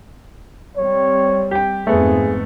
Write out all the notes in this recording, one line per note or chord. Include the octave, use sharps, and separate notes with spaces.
G3 C4 C#5
G4 G5
F2 G#2 A3 B3 G#4